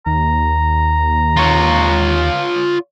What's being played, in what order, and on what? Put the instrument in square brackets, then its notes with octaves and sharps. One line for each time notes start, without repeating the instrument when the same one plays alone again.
[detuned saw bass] D#2 [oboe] A#5
[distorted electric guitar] F4 C#5